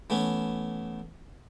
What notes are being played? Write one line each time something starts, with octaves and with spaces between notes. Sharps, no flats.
E3 A3 B3 C#4